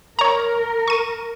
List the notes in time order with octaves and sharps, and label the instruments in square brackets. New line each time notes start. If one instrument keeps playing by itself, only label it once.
[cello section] A#4 [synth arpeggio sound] C#5 A#5
[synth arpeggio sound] C#6 D#7